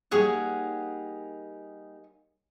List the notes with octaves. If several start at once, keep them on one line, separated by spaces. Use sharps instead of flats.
G3 A#3 D#4 G#4 C#5 F#5